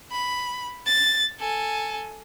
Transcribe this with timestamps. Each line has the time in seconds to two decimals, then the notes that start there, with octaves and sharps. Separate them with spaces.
0.11 B5
0.86 A6
1.40 A4 G#5